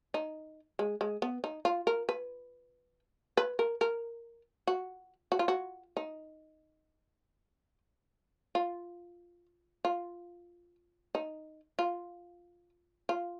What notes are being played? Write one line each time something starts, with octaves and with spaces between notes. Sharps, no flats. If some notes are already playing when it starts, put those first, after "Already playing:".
D#4
G#3
G#3
B3
D#4
F4
A#4
B4
B4
A#4
A#4
F#4
F#4
F4
F#4
D#4
F4
F4
D#4
F4
F4